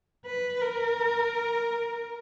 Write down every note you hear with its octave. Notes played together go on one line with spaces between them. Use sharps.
B4
A#4